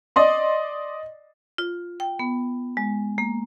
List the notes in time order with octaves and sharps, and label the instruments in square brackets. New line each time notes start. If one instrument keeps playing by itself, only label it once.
[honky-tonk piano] D5 D#5 C6
[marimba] F4
G5
B3
G#3
A#3